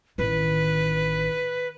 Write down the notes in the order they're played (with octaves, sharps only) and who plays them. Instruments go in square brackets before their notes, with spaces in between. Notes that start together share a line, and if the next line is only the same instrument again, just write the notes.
[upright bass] A1 D#3 [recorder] B4